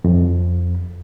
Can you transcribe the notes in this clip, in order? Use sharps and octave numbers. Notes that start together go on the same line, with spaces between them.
F2